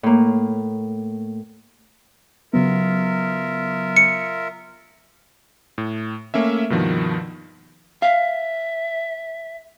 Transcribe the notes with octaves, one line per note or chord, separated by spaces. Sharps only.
A2 A#3
C#3 F#3 B3 F4 A#4 E5
C#7
A2
A3 A#3 C#4 E5
G2 B2 D#3 F3
E5 F5